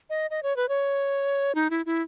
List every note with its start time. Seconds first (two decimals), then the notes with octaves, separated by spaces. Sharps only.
0.10 D#5
0.31 D#5
0.43 C#5
0.57 B4
0.69 C#5
1.55 D#4
1.70 E4
1.86 E4